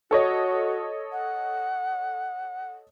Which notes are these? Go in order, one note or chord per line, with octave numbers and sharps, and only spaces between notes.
F#4 A4 C#5 D#5
F#5